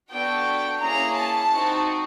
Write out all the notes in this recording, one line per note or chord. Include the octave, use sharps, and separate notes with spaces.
B3 D4 F#4 A4 G5
A#3 C#4 E4 G#4 A#5
A5
C4 D#4 F#4